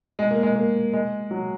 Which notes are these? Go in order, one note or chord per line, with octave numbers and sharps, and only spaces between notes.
G#3
A#3
G#3
A#3
G#3
F#3